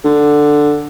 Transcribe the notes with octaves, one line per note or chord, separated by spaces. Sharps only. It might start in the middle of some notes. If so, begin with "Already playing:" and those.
D3